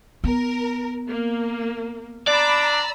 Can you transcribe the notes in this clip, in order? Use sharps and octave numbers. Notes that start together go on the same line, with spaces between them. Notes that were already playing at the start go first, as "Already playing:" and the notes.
B3 A#4
A#3
D4 D5 A#5 B5 E6